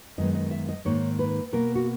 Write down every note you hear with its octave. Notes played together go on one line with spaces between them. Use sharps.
F#2 D#3 G#3 B3 D#5
D#5
E5
D#5
G#2 D#3 A#3 C#5
B4
B2 A#3 A#4
F#4